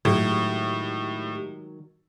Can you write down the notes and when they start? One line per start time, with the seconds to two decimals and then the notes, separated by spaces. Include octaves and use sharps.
0.05 A2 D#3 F#3 G#3 G4